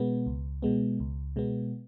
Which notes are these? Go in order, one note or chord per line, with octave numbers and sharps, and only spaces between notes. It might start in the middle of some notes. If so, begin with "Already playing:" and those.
Already playing: B2 G#3 B3
C#2
B2 G#3 B3
C#2
B2 G#3 B3